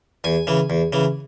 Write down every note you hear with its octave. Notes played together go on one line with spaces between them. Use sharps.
E2 G#5
C#3 E3
E2
C#3 E3